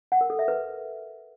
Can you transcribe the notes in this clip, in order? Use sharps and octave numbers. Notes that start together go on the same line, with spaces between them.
F#5
A#4
A4
E5
B4